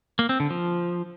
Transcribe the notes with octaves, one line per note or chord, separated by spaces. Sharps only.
A#3
C4
D3
F3